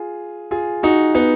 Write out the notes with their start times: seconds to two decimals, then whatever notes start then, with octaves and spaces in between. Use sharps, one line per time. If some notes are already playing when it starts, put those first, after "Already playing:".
Already playing: F4 G#4
0.51 F4 G#4
0.83 D#4 F#4
1.15 B3 D#4